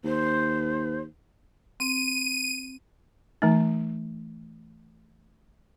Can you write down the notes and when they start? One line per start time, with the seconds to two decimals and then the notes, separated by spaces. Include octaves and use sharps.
0.04 D#2 C5
1.80 C4 D#7
3.42 E3 A3 D#4